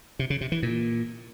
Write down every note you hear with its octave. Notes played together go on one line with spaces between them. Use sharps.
C3
C#3
C3
E3
A#2